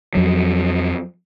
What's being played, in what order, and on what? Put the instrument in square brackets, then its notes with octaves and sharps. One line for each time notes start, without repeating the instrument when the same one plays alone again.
[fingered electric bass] F2 F#3